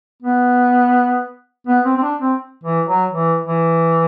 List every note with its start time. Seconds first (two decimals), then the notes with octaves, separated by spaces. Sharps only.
0.23 B3
1.67 B3
1.85 C4
1.97 C4
2.03 D4
2.21 C4
2.64 E3
2.87 F#3
3.11 E3
3.47 E3